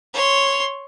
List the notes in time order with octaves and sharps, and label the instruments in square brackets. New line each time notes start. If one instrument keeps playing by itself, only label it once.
[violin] C#5 C6